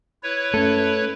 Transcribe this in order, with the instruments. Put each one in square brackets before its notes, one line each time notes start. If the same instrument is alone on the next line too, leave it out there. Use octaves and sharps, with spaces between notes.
[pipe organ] E4 B4 C#5
[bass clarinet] F#2 [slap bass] A3 [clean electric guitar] A4